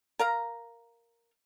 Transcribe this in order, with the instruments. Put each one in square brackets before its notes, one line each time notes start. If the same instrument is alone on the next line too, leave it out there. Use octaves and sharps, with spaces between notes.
[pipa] A#4 F5 A#5